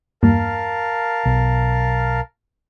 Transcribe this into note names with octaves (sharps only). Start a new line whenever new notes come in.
E2 G2 A#3 A#4 F5 A5
B1